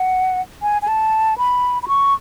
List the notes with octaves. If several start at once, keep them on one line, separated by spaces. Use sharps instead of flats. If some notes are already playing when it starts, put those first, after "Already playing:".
Already playing: F#5
G#5
G#5
A5
B5
B5
C#6